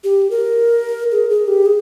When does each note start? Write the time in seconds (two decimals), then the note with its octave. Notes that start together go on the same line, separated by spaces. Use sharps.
0.04 G4
0.31 A#4
1.12 G#4
1.30 G#4
1.48 G4
1.66 G#4